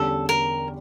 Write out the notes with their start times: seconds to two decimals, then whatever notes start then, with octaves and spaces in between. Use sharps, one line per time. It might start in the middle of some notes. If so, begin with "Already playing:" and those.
Already playing: E2 D3 G3 C#4 G4 A4
0.29 A#4